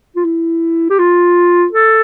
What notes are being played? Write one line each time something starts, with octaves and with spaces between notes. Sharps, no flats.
F4
E4
G4
F4
A4